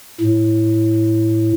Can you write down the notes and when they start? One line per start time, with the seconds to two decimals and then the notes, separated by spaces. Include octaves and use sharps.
0.21 A2